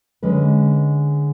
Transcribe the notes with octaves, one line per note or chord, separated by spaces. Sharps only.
D3 G#3 C#4 B4